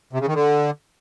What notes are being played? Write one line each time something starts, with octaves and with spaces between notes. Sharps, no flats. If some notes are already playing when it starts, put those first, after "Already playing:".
C3
C#3
D#3
D3